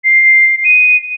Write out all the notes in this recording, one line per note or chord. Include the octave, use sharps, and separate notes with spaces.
C7
D#7